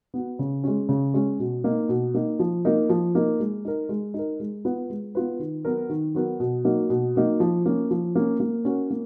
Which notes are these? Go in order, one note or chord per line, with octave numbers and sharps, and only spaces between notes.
B3 F#4
C#3
G#3 C#4
C#3
G#3 C#4
B2
A#3 D#4
B2
A#3 D#4
F3
A#3 D#4 A#4
F3
A#3 D#4 A#4
G#3
D#4 A#4
G#3
D#4 A#4
G#3
B3 F4 B4
G#3
B3 F4 B4
D#3
F#3 B3 F#4 A#4
D#3
F#3 B3 F#4 A#4
B2
F#3 A#3 D#4
B2
F#3 A#3 D#4
F3
A#3 C#4
F3
A#3 C#4
A#3
C#4 F#4 A#4
A#3